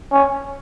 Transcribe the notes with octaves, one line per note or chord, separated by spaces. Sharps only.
C#4